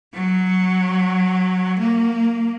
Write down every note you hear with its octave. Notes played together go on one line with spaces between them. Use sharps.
F#3
A#3